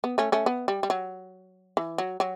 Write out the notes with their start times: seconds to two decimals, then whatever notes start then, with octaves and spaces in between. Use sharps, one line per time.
0.04 B3
0.18 A3 C#4
0.32 A3 C#4
0.46 B3
0.68 G3
0.83 G3
0.90 F#3
1.77 E3
1.98 F#3
2.20 F#3